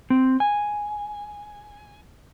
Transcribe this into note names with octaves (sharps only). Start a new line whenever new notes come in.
C4
G#5